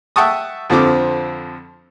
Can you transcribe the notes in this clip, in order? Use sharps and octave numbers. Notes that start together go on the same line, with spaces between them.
E5 F#5 G5 A5 C#6 D#6
F2 D3 F3 C4 D6